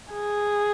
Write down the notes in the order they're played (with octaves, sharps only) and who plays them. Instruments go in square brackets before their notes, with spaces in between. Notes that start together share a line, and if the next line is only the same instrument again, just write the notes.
[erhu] G#4